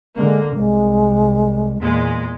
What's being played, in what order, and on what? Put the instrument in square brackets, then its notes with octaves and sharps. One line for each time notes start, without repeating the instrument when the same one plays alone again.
[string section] D3 A#3 [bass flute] G#3
[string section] C2 [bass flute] G#3
[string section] E2 A#2 G#3